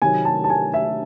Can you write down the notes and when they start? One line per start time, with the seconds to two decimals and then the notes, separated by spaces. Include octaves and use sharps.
0.02 C3 D#3 F#3 G#5
0.25 A5
0.44 A5
0.50 G#5
0.74 E5